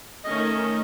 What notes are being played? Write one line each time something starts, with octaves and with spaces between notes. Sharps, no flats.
D#3 A3 C#4 D#5